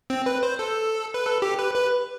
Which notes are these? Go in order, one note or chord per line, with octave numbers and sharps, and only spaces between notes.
C4
B4
C5
A4
B4
A4
G4
B4
B4